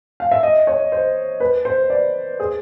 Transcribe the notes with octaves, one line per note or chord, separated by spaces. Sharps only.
F5
E5
D#5
C#5
C5
B4
C5
D5
G#4